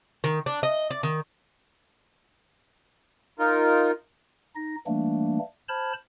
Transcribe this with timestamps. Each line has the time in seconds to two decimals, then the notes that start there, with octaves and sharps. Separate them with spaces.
0.24 D#3
0.46 D4
0.63 D#5
0.91 D5
1.03 D#3
3.39 D#4 F4 A#4
4.55 D#4 A#6
4.87 E3 G3 A3 A#3 D4
5.69 C5 A5 B5 F6 G#6